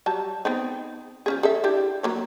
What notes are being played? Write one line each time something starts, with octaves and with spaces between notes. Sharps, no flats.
F#3 G3 A5
B3 C4 D#4
F3 C#4 G#4
G#4 A4 E5
D4 E4 G4
F#3 A#3 C#5